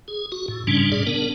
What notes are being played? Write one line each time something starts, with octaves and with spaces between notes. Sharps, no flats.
G#4
F#4
A2
G#2 C#3 G3 C#4 D4
A#2 G#4 D5
B3 D4 A#4